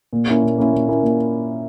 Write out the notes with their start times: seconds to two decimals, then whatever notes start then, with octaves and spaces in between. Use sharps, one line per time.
0.13 A#2
0.28 A#3 C#4 E4
0.43 A#2
0.58 A#3 C#4 E4
0.73 A#2
0.88 A#3 C#4 E4
1.02 A#2